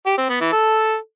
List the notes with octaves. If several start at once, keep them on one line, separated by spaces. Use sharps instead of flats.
G4
C4
B3
E3
A4